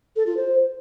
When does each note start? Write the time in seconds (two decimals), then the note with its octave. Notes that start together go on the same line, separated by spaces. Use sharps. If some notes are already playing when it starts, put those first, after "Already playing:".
0.16 A4
0.26 F4
0.37 C5